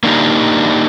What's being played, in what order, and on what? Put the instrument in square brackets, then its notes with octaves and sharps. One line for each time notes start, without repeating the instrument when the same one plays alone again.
[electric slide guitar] A#3 D4 D#4 G4